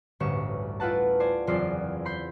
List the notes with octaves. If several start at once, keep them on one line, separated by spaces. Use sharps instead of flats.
A1 D2 G2 C#4 C#6 E7
E4 F4 B4 F#5 A5
C5 D5 G#5
F#1 E2 C4 F4 D5 C7
B5 C6 G6